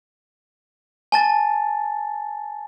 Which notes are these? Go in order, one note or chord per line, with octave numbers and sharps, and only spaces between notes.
G#5 A5 A6